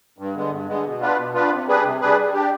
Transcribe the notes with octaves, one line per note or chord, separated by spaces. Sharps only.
G2
D3 G#3 B3
G2
D3 G#3 B3
B2
B3 D4 F4 B4
B2
B3 D4 F4 B4
C3
G3 D4 G#4 B4
C3
G3 D4 G#4 B4
G3
D4 G4